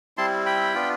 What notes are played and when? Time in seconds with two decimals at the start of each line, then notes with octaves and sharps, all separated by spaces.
0.17 G3 C4 E4 A5 C6
0.46 G5 B5
0.74 B3 D4 F4